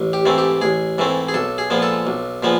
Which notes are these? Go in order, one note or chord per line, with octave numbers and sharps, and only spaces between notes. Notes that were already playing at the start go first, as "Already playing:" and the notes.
Already playing: A1
G4
G#2 E3 A3 C4
G4
A1 G#4
G#2 E3 A3 C4
G#4
B1 A4
G#4
A#2 F3 G#3 B3
A4
B1
A#2 F3 G#3 B3